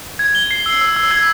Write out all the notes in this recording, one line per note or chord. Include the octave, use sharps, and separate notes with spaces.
G#6
G7
C7
E6
E6
E6
G#6